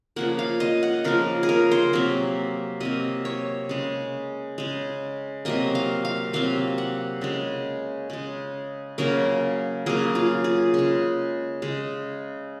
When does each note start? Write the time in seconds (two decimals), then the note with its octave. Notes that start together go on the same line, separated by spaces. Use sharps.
0.16 C#3 F3 A#3 F#5
0.39 F5
0.60 D#5
0.83 F#5
1.04 C#3 F3 A#3 A#4
1.43 G#4
1.49 A#4
1.71 C5
1.93 C3 F#3 A#3
2.80 C3 F#3 A#3 D#5
3.25 C#5
3.69 C#3 G#3
4.58 C#3 G#3
5.45 C3 F#3 A#3 D#5
5.75 F5
6.05 F5
6.33 C3 F#3 A#3 F5
6.78 F#5
7.21 C#3 G#3
8.10 C#3 G#3
8.98 C#3 F#3 A#3 A#4
9.86 C#3 F#3 A#3 G#4
10.15 F4
10.44 G#4
10.74 C#3 G#3
11.62 C#3 G#3